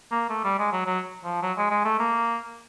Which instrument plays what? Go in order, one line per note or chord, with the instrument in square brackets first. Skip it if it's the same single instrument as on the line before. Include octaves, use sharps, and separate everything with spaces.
[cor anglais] A#3
A3
G3
G#3
F#3
F#3
F3
F#3
G#3
G#3
A3
A#3